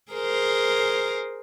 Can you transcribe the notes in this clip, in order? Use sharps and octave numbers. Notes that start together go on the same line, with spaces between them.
G#4 A#4 C5